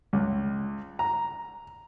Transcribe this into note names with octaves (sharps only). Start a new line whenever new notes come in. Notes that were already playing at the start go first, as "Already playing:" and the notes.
C#2
A#5